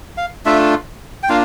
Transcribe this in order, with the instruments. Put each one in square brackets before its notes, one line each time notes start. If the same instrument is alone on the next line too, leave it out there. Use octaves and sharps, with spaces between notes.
[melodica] F5
A3 D4 F4 E5
G5
A#3 D4 F4 F5